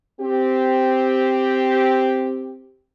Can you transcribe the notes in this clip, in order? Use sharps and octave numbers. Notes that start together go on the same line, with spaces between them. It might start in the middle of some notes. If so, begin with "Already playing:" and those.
C4 G4